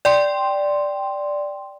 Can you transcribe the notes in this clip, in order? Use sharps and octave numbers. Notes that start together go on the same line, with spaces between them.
D5 G5 C6